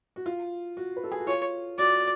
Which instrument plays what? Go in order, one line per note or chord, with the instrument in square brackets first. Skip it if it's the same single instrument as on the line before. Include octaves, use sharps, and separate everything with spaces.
[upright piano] F#4
F4
F#4
B4
A4
G#4
F#4
[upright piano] F4 [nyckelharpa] C#5
[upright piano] F#4 [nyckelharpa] D5